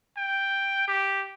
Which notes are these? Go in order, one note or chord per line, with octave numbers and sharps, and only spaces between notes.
G5
G4